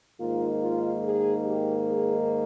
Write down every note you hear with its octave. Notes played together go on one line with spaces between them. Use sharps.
G#2 D#3 A#3 F4
F4
G#4
G4
G#4